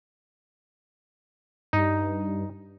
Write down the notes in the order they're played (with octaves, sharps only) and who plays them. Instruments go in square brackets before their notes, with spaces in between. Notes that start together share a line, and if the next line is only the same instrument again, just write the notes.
[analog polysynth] G2 [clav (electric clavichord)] D#4